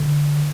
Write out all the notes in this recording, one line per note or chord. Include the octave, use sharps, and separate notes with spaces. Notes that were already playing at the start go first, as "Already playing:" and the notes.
Already playing: D3